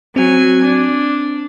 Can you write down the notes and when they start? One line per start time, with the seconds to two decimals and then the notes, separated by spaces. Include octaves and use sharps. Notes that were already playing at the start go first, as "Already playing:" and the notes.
0.16 F#3 C4 G#5
0.64 D4